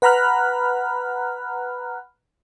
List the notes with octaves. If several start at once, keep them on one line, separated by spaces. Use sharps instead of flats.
B4 F#5 A#5 B5 F6 F#6